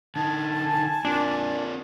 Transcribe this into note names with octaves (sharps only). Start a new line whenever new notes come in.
D3 D#4 G#5 A5
C4 D4 F4 A#4